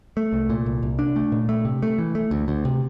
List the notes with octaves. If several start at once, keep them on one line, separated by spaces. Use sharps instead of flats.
A3
C2
A#2
C2
C2
D4
A3
A#2
A3
C3
A3
E3
A3
D2
D2
C3